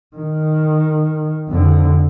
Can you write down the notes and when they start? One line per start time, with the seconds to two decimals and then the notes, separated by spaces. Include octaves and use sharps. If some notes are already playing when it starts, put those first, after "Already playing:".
0.16 D#3
1.49 F2 D3